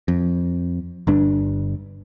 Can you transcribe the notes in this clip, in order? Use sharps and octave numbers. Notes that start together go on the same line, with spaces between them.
F2
G1 G2 D4